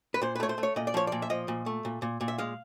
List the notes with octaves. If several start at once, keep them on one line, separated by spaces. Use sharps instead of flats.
B4
A#2 C5
B4
A3 C#5
C5
A3
C#5
A#2 D#5
D5
F3 C#5
A#2 D5
E5
F3 D#5
A#2
A3
A#2
A#2
A#2
E5
G#3 F5